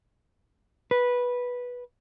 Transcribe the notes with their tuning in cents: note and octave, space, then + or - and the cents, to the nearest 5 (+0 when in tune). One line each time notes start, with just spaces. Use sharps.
B4 -10